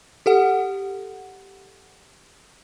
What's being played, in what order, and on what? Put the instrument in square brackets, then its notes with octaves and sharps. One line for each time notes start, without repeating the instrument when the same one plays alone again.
[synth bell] G4 A4 F#5